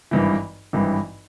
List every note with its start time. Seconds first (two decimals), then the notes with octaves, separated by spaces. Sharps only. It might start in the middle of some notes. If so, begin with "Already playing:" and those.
0.11 G#1 G2 E3
0.73 G#1 G2 E3